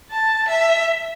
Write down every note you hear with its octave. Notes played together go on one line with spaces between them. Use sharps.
A5
E5